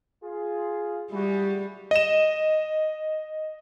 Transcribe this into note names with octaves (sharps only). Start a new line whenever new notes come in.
F4 G#4
G3 E4 F#4 G#4
D#5 E7